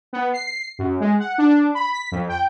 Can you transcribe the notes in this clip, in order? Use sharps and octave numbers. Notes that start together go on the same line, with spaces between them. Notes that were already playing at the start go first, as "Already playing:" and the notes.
B3
C7
F#2
G#3
F#5
D4
B5
B6
F2
G5